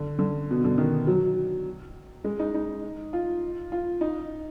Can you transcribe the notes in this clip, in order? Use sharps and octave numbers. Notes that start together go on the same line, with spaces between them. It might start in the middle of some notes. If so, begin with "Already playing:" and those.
Already playing: D3
D3
B2
D3
D#3
F#3
G#3
D#4
D#4
F4
F4
D#4